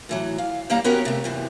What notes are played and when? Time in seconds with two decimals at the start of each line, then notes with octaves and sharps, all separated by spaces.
0.09 A2 E3 F#3
0.38 F5
0.70 D#2 G3 A#3 F5 A#5
0.84 B3 C#4 F#4 G4 A#4 C#5
1.05 C3 A3
1.24 F#2 C3 E3